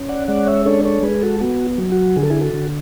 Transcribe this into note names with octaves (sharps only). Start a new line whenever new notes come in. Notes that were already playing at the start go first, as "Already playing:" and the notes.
Already playing: C#4
D5 F#5
G#3 D5 F#5
C#5 E5
D4 A4 C#5
A4 C#5
G#3 G#4 B4
F#4 A4
B3 F#4
F#3
F#4
D3 G#4
A4
E4 G#4
F#4 A4
D3